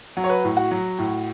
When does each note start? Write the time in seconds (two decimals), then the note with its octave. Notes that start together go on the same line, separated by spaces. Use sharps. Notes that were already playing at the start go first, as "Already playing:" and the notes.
0.17 F#3
0.24 C#5
0.29 B4
0.44 A2
0.57 F#4
0.71 F#3
0.98 A2